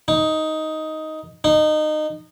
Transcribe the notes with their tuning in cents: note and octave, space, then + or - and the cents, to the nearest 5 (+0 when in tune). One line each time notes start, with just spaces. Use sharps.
D#4 +10
D#4 -20